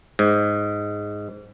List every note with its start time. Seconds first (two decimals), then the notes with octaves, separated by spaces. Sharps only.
0.19 G#2